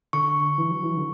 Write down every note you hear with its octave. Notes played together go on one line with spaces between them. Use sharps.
D3 C#6
E3
F#3
E3
D3